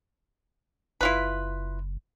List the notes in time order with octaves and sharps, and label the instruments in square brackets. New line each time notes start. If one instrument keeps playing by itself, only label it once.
[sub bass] F#1 [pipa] E4 F4 B4